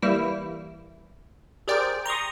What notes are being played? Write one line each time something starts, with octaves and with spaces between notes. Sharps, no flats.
E3 G3 A#3 E4
G4 G#4 A#4 C5 D5 G5
A#5 C6 C#6 D#6